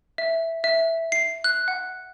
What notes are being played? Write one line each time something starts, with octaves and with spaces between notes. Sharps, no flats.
E5
E5
C7
F#6
F#5